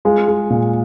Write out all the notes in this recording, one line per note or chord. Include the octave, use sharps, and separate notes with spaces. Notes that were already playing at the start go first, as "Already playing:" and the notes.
G#3 F4
G#3
A#2